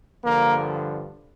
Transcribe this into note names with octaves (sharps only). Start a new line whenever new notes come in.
G2 D3 F3 A#3